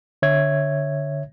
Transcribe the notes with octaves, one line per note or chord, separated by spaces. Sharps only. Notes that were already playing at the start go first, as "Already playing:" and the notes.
D3 C#5 E5 G#6